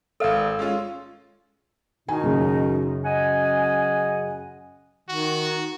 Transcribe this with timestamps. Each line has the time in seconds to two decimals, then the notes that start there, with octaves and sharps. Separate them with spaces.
0.20 G#1 A4 D5 F5 E6
0.59 G#3 C#4 F4
2.09 B2 D#3 D#4 G#5
2.24 F#2 C#3
3.04 D#5 F#5 G#5
5.09 D#3 F#4